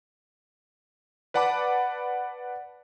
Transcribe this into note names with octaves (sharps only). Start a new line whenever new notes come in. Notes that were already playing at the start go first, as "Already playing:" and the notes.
B4 D5 F#5 A5 B5 D6